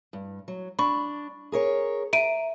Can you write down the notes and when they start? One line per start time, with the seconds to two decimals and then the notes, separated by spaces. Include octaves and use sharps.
0.13 G2
0.48 F#3
0.79 D4 B5 C#6
1.52 G#4 A#4 C#5
2.13 E5 A#5 D7 D#7